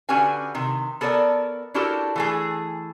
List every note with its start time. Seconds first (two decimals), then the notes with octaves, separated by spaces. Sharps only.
0.09 D3 C#4 F#4 G4 B4 G#5
0.55 C3 D#3
1.01 B3 A4 A#4 C#5 D5
1.74 D4 E4 F#4 G4 A4 A#4
2.16 E3 A3 G#4